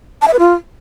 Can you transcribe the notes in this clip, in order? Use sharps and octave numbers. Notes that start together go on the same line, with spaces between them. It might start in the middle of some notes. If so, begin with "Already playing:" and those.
A5
E5
B4
F4